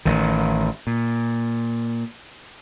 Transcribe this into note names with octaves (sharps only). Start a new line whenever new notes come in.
A1 D#3
A#2